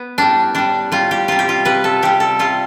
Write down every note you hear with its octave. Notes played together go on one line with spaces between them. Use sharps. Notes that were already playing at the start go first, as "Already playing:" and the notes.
Already playing: B3
A2 G3 D4
A2 G3 D4
A2 G3 F4
G4
C3 G3 F4
G4
F4
C3 G3 B4
A4
C3 G3 G4
A4
C3 G3 F4